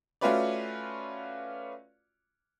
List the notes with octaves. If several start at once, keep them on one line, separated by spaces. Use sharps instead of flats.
A3 C#4 F4 F#4 B4 D5